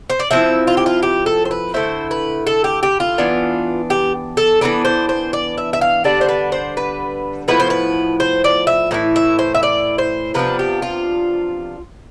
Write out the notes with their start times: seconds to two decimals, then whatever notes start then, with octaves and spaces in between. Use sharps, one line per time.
0.10 C5
0.19 D5
0.31 F3 C4 E4 E5
0.67 F4
0.77 G4
0.86 F4
1.03 G4
1.26 A4
1.45 C5
1.51 B4
1.74 D3 A3 E4 C5
2.11 B4
2.47 A4
2.64 G4
2.83 G4
3.00 F4
3.18 E3 B3 D4
3.90 G4
4.37 A4
4.61 E3 B3 D4 B4
4.85 C5
5.09 C5
5.33 D5
5.58 E5
5.73 E5
5.81 F5
6.04 D3 G3 B3 D4 D5
6.21 C5
6.28 B4
6.52 C5
6.77 B4
7.48 A2 F3 B3 E4 B4
7.60 C5
7.70 B4
8.20 C5
8.44 D5
8.67 E5
8.91 A2 E3 E4
9.16 E5
9.39 C5
9.55 E5
9.63 D5
9.98 C5
10.34 C3 F3 B3 D4 B4
10.59 G4
10.82 F4